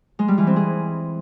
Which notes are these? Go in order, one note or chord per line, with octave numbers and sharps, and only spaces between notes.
G#3
G3
E3
C4
G#4